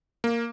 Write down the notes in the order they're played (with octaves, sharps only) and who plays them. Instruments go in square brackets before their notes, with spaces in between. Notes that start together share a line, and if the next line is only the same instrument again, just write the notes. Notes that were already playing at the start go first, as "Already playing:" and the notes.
[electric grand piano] A#3